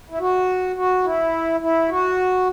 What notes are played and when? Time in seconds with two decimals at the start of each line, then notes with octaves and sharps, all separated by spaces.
0.10 E4
0.20 F#4
0.76 F#4
1.04 E4
1.60 E4
1.89 F#4